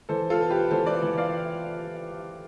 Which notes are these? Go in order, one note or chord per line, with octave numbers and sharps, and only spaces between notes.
E3 A4 C5
F4 A4
B3
G4 B4
E3 A4 C5
B4 D5
E3
D5 F5